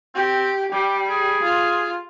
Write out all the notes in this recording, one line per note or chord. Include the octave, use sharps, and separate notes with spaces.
C4 G4
G3 G4
G#4
F4